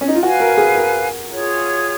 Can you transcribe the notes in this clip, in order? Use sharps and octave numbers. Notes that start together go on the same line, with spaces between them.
C#4
D#4
F4
F#4 B4 F5 G#5
A#4
G#4
A#4
F4 G#4 C#5